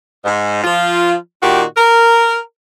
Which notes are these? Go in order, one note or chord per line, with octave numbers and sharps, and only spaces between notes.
G#2
F3 F4
A#2 D#3 F#4 G4
A#4